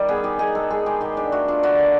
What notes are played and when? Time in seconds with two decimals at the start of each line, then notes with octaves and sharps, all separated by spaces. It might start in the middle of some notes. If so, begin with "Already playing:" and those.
Already playing: D#3 G3
0.08 B3 G#4
0.24 D#4 G4
0.39 D#4 G#4
0.55 G#3 A4
0.70 G#3 G#4
0.86 G#3 G4
1.01 D#3 G4
1.17 D4 G4
1.32 A3 F#4
1.48 D4 F4
1.63 D3 F#4
1.79 A#3